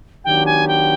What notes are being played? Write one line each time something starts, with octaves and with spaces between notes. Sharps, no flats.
D#3 F#3 B3 D4 G4 G5
G#5
G5